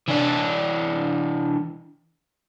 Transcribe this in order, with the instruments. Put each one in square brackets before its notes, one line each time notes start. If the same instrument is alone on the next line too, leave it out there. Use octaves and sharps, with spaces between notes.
[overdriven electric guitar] E3 D4